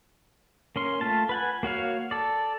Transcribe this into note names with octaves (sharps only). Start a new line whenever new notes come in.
A#3 C#4 C6
A3 F4 A5
B4 F#5 G#5
A#3 F#4 C#5 F5
A4 D5